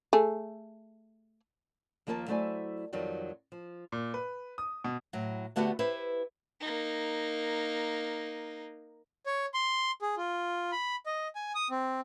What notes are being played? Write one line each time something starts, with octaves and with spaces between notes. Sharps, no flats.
A3 G#4
D#2 F3 A#3 A#4 D#5 A5
F#3 A3 E4 C5 D5 G#5
F2 D#3 F#3 G3 C4
F3
A#2
B4
D#6
B2
A2 F#3
D3 A3 B3 F#4 G4 A4
E4 G4 B4 C5 E5
A#3 D#4
C#5
C6
G#4
F4
B5
D#5
G#5
D#6
C4